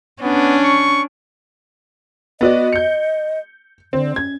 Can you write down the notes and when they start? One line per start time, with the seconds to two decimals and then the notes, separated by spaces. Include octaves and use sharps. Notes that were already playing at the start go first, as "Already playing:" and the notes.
0.22 B3 C#4 D4
0.63 C#6
2.41 B3 F#4 D5 D#5
2.73 G6 C#7
3.93 D3 C4
4.16 C#4 G#6